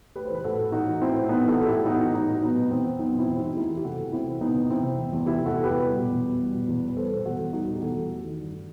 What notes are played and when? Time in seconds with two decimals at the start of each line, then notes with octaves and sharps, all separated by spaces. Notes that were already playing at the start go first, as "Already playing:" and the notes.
0.15 A3 G4 B4
0.25 E3 C5
0.35 B4
0.44 A2 F#4 A4
0.59 A2
0.72 A3 D#4 F#4
0.86 E3
1.01 A2 C4 E4
1.15 A2
1.29 B3 D#4
1.44 E3 F#4 A4
1.58 A2 A4
1.67 E4 G4
1.73 A2
1.86 B3 D#4 F#4
2.00 E3
2.14 A2 D#4 F#4
2.29 A2
2.42 F#3 B3 D#4
2.56 B2
2.71 E2 C4
2.85 E2
2.99 F#3 B3 D#4
3.14 B2 C4 E4
3.27 E2
3.37 D#4 F#4
3.43 E2
3.53 F#4
3.56 A3 E4 G4
3.71 E3
3.77 G4
3.84 C3 F#4 A4
3.99 C3
4.12 A3 C4 E4
4.27 E3
4.41 C3 B3 D#4
4.55 C3
4.70 E3 C4 E4
4.83 C3
4.99 E2
5.13 E2
5.26 E3 E4 G4
5.41 C3 F#4 A4
5.54 E2
5.64 G4 B4
5.70 E2
5.84 G3
5.97 B2
6.11 E2
6.26 B3
6.40 G3
6.54 B2
6.68 E2
6.82 B3
6.88 B4
6.96 G3 A4 C5
7.11 B2
7.25 E2 F#4 A4
7.39 E2
7.53 G3 D#4 F#4
7.68 B2
7.75 G4
7.81 E2 F#4 A4
7.95 E2
8.11 A3
8.24 D#3
8.38 G2